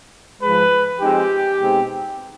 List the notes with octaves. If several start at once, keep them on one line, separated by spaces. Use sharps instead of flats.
G#2 F3 G#3 B4
F3 G#3 C4 D#4 G4
B2 G#3 C4 D#4